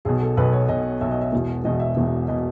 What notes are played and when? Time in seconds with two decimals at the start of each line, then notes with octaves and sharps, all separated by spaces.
0.05 B1 B2 G#4
0.22 A4
0.37 B1 B2 B4
0.53 C#5
0.69 B1 B2 D#5
1.01 B1 B2 E5
1.11 D#5
1.21 E5
1.32 E1 E2 B2
1.64 E1 E2 B2 D#5
1.80 E5
1.97 E1 E2 B2
2.28 B2 D#5